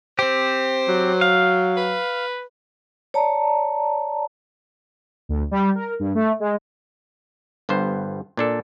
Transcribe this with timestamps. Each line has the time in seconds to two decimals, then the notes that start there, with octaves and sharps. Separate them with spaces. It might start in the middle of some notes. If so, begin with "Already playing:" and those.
0.19 C4 G4 C5
0.88 F#3
1.21 F5
1.77 B4
3.14 C#5 D5 A5 A#5
5.29 D2
5.51 G3
5.75 A#4
5.99 G2
6.15 A3
6.40 G#3
7.69 G1 G2 B3 C5
8.37 A#2 D4 A4